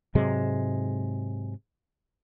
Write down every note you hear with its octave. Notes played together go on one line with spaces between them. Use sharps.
G#2 C3 F#3 G#3